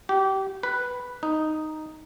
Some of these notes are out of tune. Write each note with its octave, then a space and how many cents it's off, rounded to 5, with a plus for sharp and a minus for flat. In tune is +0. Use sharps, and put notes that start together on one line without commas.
G4 -25
B4 +0
D#4 -5